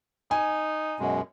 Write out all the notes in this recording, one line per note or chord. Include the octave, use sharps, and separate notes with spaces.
D#4 G#5
F#2 B2 G#3